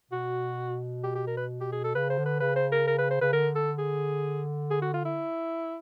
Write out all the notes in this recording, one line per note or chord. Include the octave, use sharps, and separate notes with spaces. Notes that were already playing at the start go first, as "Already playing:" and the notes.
B2 F#4
G4
G4
A#4
B4
G4
G#4
A4
C#3 B4
C5
D3
B4
C#3 B4
C5
A#4
A#4
B4
C5
C#3 B4
D3 A#4
A4
G#4
G#4
F#4
F4
E4